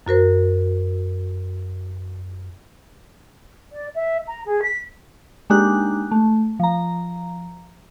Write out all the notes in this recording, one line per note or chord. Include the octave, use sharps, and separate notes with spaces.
F#2 F#4 A#4 C5
D5
E5
A#5
G#4
B6
G#3 A#3 D4 D#4 G4 F#6
A3
F3 A#5